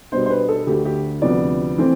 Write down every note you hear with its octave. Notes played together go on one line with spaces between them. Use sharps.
B2 G3 B3 D4 C5
C5
B4
A4
D2 D3 A3 G4
G4
D2 C3 F3 B3 D5
E3 A3 C4